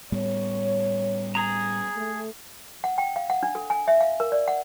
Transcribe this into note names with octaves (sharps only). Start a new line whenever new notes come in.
A2 G3 B3 C#5
G#4 A#5
A3
F#5
G5
F5
F#5
D4
A4
G#5
E5
F5
A#4
D5
F#5